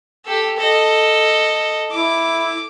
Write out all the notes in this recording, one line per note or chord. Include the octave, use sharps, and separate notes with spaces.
G4 A4
A4 D#5
E4 D6